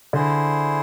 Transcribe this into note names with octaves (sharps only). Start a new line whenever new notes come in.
D3 E4 G#4 C5